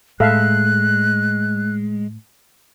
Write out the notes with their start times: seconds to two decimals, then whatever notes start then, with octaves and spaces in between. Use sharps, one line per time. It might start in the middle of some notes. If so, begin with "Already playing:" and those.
0.20 A2 G#3 A4 E5 F5 F#6